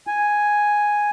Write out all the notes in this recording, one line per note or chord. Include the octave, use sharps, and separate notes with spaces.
G#5